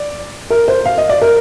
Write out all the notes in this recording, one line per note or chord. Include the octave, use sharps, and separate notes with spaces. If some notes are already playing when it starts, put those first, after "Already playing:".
Already playing: D5
A#4
C5
F5
D#5
D5
A#4